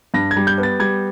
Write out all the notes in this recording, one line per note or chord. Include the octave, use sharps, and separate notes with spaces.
G2 A#6
G#6
G3
G6
B3
A6
G3 G#6